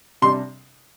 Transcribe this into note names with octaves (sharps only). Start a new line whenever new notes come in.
C3 G3 D4 C6